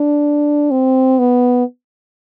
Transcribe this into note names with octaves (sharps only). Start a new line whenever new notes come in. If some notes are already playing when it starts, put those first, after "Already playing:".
Already playing: D4
C4
B3